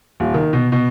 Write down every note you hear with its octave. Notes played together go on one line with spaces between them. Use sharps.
D#1
D#3
B2
B2